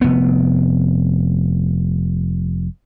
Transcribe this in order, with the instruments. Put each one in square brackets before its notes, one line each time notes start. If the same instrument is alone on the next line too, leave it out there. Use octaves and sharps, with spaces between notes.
[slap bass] F1 B3